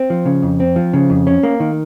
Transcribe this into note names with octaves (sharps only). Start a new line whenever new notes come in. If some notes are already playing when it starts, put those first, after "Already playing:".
Already playing: C4
F3
C#3
F2
C4
F3
C#3
F2
C#4
A#3
D#3